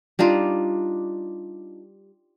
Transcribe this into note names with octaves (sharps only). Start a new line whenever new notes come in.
G3 D4 D#4 F4